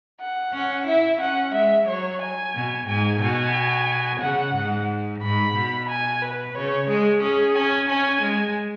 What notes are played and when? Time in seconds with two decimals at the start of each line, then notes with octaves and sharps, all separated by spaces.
0.20 F#5
0.54 C#4
0.87 E4 E5
1.21 C#4 F#5
1.54 G#3 E5
1.88 F#3 C#5
2.21 G#5
2.55 B2
2.88 G#2 G#5
3.21 B2 G#5
4.21 C#3 F#5
4.55 G#2
5.22 G#2 B5
5.55 B2
5.89 G#5
6.22 B4
6.55 C#3 C#5
6.89 G#3 G#4
7.22 C#4 G#4
7.55 C#4 G#5
7.89 C#4 G#5
8.23 G#3